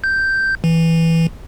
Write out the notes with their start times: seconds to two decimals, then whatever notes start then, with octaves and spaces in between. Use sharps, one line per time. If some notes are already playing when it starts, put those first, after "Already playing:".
0.04 G6
0.64 E3